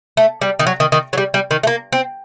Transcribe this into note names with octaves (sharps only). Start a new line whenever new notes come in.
A3
G3
D#3
F#3
D#3
D#3
F#3
G3
G3
D#3
A3
A#3
C4